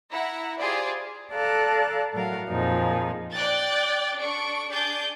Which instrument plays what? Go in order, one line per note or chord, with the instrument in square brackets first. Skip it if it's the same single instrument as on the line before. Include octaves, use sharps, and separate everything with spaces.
[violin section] E4 F#5 A#5
F4 G4 G#4 C5 D5
[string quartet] A4 D5 F5 A5 A#5 F#6
A2 F#3 A#4 F5 F#5
F2 A#2 F3 D#4 G#4
[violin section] D5 G5 F#6 G6 A6
D4 A4 C#6 D7
D4 G#4 D6 G6 A6